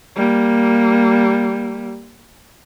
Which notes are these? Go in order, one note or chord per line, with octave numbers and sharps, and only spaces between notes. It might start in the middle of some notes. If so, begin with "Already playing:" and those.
G3 A#3